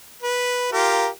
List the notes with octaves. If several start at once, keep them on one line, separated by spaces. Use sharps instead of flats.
B4
F4 G4 A#4